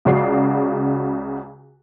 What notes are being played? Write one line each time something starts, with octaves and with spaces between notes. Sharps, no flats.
C#2 C#3 F#4 D5 C7